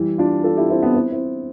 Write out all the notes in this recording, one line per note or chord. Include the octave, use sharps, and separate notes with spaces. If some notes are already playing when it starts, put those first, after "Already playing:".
Already playing: E3 G3
D4 F4
F4 A4
E4 G4
C4 E4
B3 D4
C4 E4
C4 E4